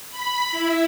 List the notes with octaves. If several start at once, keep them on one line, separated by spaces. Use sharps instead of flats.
B5
E4